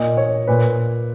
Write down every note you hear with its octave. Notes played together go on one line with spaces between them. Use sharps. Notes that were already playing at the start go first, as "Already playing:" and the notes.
Already playing: A#2 D#5
C#5
A#2 B4